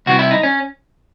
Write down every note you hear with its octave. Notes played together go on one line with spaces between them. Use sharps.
C2 C3 E3 F#4
E4
D#4
C#4